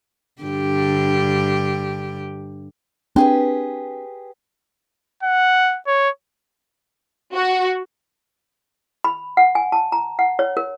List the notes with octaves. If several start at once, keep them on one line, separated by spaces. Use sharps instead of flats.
G2 D3 G4
C4 D4 G4 G#4 B4
F#5
C#5
F#4
B5
F#5
G#5
A5
A#5
F#5
C#5
A#4